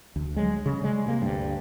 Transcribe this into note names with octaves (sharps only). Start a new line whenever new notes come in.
D2
F#3 G#3
C#3
G3 G#3
C3 A#3
D2 G2